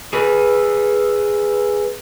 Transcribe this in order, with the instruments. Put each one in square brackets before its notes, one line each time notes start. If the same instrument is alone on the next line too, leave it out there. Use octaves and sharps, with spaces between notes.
[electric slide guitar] G#4 B4